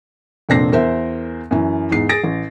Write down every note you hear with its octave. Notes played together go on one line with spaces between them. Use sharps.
F1 A#2 C4 D4 A#6 C7
E2 A#4 C5 E5
F#2 E3
E2 G#2 C7
G#4 A6 A#6 D7
A1